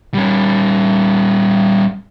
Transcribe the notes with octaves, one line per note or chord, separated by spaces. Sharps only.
G3 C#4